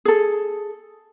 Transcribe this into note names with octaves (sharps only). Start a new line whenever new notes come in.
G#4 A4